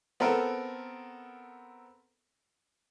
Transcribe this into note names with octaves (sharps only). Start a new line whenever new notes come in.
B3 C4 A4 A#4